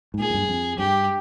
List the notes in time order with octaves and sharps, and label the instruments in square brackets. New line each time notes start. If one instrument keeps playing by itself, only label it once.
[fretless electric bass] G#2
[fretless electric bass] A#2 [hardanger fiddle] G#4
[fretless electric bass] F2
G2
F2
[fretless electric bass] G2 [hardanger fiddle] G4